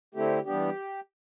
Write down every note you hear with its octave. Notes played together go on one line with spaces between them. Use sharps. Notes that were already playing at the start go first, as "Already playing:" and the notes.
D3 A3 C4 E4 G4
E3 G3 B3 D4 G4